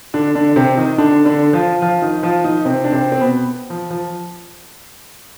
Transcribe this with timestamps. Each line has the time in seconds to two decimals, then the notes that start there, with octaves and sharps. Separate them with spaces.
0.14 D3 D4
0.35 D3 D4
0.56 C3 C4
0.77 D#3 D#4
0.98 D3 D4
1.25 D3 D4
1.53 F3 F4
1.82 F3 F4
2.02 D#3 D#4
2.23 F3 F4
2.44 D#3 D#4
2.65 C3 C4
2.84 D4
2.93 C3 C4
3.12 C4
3.21 B2 B3
3.70 F3
3.90 F3